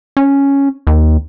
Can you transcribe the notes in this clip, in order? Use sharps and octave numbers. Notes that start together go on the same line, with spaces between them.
C#4
D#2